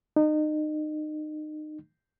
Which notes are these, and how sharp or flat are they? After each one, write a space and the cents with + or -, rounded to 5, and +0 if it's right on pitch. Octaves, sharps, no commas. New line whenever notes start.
D#4 -30